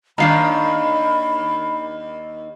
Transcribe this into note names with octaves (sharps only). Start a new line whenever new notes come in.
D#2 D#3 D4 F5 A#5 B5